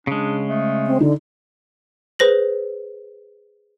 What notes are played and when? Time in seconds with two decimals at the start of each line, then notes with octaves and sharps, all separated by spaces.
0.07 C#3 G#3 D4
0.48 A3
0.86 C4
1.00 D3 D#4
2.19 G#4 B4 C5 A#6 F#7